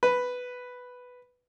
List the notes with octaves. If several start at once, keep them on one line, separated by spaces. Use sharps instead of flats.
B4